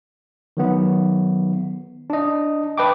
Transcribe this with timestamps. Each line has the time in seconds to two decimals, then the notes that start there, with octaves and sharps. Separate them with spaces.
0.57 D#3 F#3 B3
2.10 D4 D#5
2.78 B4 D#5 G5 A5 D6